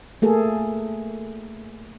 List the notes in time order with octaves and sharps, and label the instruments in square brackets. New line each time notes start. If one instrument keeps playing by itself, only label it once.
[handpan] A3 A#3 G#4 A4